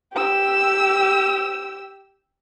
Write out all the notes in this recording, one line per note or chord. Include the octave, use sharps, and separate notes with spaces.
G4 E6